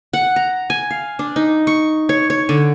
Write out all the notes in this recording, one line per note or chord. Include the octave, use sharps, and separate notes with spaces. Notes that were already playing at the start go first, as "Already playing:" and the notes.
F#5
A#5
G#5
F5
D4
D#4
C#6
C#5
C#5
D3